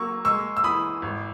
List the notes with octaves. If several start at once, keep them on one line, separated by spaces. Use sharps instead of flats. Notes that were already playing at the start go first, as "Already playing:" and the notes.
Already playing: F#3 A#3 C#6 E6
G#3 C#6 E6
E6
E3 B5 D#6
G#1